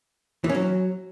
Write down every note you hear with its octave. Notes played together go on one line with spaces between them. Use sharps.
E3
C#4
F#3